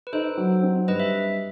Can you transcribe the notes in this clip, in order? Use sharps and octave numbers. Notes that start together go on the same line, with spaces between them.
B4
D#4 A4 C5
F#3
C4
G2 B4 D#5
E5